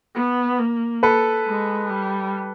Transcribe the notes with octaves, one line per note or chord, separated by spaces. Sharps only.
B3
A#3
A4 B4
G#3
G3